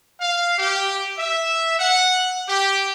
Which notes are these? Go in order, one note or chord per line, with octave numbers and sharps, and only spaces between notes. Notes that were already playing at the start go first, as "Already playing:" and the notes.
F5
G4
E5
F#5
G4